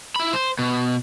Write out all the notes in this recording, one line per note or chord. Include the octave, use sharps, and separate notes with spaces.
E4 B5
C5
B2